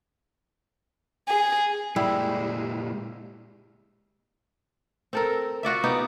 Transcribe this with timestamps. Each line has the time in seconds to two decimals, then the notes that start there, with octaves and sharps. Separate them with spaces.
1.28 G#4
1.96 A#2 G3 G#3 E4
5.13 C4 A4 A#4
5.63 F4 F#4 D5 E5
5.84 B3 D#4 G4